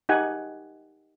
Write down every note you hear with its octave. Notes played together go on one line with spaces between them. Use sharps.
D#4 G4 F#5 G#5